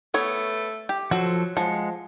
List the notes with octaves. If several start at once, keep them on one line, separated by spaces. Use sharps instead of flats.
A3 B3 C#5
G4
F3 F#3 F#4 A4 C5
F3 G#3 F#5